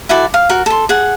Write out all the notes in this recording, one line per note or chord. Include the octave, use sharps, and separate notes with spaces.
E4 F#4 A4 D5
F5
F#4 A#4
A4 C6
G#4 F#5